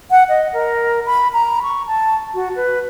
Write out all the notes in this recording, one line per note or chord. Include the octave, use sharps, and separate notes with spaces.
F#5
D#5
A#4
B5
A#5
C#6
A5
F#4
B4